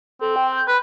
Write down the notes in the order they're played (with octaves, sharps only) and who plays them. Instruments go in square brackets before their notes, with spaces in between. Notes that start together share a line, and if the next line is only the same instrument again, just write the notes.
[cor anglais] C4 [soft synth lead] A4
[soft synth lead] G5
G6
[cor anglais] B4 [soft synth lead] B5